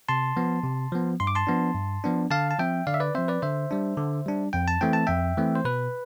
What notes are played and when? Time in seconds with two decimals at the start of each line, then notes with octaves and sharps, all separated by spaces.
0.09 C3 A5 C6
0.37 F3 B3
0.64 C3
0.92 F3 B3
1.20 G2 C6
1.27 D6
1.35 A5 C6
1.47 F3 B3 D4
1.75 G2
2.04 F3 B3 D4
2.30 D3 F5 A5
2.51 A5
2.59 F3 C4 E5 G5
2.87 D3 D5 F5
2.94 E5
3.00 B4 D5
3.15 F3 C4 C5 E5
3.28 B4 D5
3.42 D3 C5 E5
3.71 G3 D4
3.97 D3
4.26 G3 D4
4.53 F2 G5
4.68 A5
4.81 E3 A3 C4 G5
4.93 A5
5.07 F2 E5 G5
5.37 E3 A3 C4
5.56 C5
5.65 B2 B4